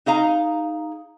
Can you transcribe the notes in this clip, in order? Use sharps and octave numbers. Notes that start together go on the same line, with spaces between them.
D#4 G#4 F5 A#5